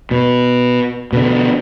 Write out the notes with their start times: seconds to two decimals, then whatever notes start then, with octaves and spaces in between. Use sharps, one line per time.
0.11 B2
1.13 B2 D3